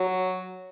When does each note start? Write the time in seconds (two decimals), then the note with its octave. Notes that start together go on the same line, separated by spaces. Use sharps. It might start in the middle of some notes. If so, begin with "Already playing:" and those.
Already playing: F#3